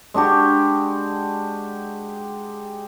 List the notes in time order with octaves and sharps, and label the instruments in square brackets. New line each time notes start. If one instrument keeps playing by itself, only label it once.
[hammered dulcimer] G#3 D4 F#4 G4